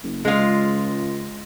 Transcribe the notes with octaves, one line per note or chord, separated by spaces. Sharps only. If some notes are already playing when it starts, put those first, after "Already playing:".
F#1
C#2 G#3 F4